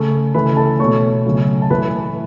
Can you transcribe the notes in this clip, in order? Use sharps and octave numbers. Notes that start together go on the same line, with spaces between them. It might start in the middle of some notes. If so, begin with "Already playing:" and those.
Already playing: C#3 A3 C#5 C#6
C#3 E3 A3 B4 B5
A4 A5
B2 A3 C#5 C#6
C#3 F#3 A3
A5
A2 E3 A3 B4 B5